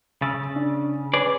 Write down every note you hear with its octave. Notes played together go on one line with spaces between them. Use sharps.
C#3 E6 A6
D4
G#4 B4 C#5 D5